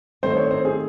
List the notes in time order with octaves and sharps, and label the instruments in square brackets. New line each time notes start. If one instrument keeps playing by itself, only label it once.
[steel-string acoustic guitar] D#3 A3 C4 [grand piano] C5
[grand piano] C#5
C5
G#4